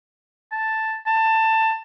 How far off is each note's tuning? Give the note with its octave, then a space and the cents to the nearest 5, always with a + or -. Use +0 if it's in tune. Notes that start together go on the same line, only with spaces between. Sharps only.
A5 +0
A5 +20